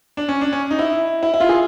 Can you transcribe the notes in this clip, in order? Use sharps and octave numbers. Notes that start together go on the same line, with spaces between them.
D4
C#4
D4
C#4
D#4
E4
E4
E4
F4
G#4